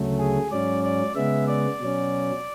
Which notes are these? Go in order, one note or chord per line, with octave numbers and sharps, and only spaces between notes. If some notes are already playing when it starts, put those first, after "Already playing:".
Already playing: D2 C#3 F#3 A3
G#4
G#2 F#3 C#4 D5
D5
C#3 G#3 B3 E5
D5
B2 F#3 C#4